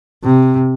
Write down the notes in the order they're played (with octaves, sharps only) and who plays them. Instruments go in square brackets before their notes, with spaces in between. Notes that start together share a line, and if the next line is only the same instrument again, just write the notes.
[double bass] C3